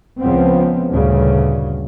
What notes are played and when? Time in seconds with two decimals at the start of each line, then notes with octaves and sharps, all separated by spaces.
0.20 C#2 C#3 F3 B3 C4
0.91 D2 G2 A#2 C#3